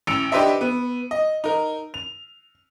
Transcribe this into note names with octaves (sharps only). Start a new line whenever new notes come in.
A1 E6 C#7 D7 F7
D4 G4 B4 C5 D#5 E5
B3
D#5
D#4 A#4
F7